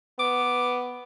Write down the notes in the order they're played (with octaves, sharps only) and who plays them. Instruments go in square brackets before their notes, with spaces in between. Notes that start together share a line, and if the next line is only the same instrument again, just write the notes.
[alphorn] B3 [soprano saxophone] D6